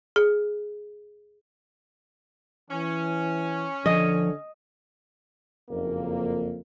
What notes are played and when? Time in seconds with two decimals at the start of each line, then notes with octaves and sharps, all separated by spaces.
0.16 G#4
2.70 E3 C#4
3.86 D3 F3 D#5
5.70 F#1 F2 A#3